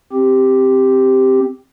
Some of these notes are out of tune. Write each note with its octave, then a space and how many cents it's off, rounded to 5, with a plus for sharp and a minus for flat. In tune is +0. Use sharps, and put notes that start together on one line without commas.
C4 +0 G4 +0